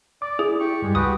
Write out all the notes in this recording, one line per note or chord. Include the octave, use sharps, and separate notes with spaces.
D5 D6
E4 G#4
G4 C#6
G2 G3 G#3
C#2 F#4 G4 B4 D#6